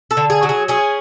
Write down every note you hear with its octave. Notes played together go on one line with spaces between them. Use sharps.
A4
D3
G#4
F#3
G#4
C#4 G#4